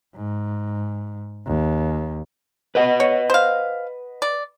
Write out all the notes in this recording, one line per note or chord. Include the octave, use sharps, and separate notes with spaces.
G#2
D#2
B4 D#5 F#5
C#5
C5 F5
D5